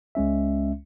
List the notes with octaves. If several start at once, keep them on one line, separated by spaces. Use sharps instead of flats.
C#2 G#3 C#4 E5